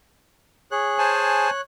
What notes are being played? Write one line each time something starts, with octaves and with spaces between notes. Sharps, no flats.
G#4 C#5 F#6
C5 G#5 A5